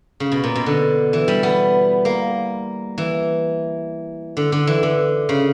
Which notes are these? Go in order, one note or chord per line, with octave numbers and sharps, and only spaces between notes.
C#3
B2
A#2
B2
D3
E3
G3
B3
A#3
E3
D3
D3
E3
D3
C#3